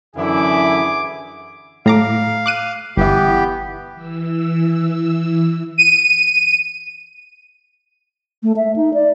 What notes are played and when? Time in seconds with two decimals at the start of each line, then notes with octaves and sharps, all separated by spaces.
0.16 F#2 D3 E3 E4 G#4 D6
1.86 A2 F5 A#5 D6
2.46 D6 F#6 D#7
2.97 G1 E3 B3 E4 G4
3.93 E3 E6
5.78 D#7
8.43 A3
8.57 E5
8.76 D#4
8.94 D5